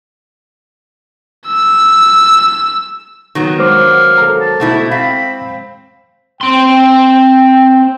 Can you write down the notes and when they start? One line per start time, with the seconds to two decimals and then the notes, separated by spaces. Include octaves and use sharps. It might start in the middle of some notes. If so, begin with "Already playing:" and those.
1.47 E6
3.35 D#3 F#3 B3
3.59 G#3 C5 F5 D6
4.18 A4 A#5
4.41 A5
4.60 B2 A3 E4
4.91 C4 F5 B5
6.41 C4 G5 C6